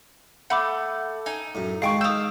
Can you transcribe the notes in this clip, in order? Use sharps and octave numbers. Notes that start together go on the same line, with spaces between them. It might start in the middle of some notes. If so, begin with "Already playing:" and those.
A3 F#5 B5 D6
D#4 G#5
F#2 A2
D#3 G#3 F5 G5 A5 C#6
F5 D#6 E6 G6